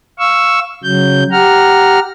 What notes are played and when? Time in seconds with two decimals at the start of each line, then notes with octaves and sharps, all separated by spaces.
0.19 F5 C#6 E6
0.84 C#3 F#3 G6
1.32 G4 F#5 A#5 F6